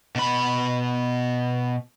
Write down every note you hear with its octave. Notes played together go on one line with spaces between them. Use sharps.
B2 B5